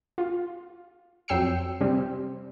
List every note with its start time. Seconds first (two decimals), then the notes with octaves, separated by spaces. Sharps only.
0.18 F4
1.28 F2 F#3 G5 E6 C7 C#7
1.80 C3 G3 C4